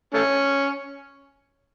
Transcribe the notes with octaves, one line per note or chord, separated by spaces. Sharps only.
A3 C#4